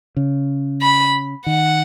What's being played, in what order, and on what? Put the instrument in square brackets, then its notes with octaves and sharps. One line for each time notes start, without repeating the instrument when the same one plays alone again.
[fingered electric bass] C#3
[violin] B5
[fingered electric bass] D#3 [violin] F#5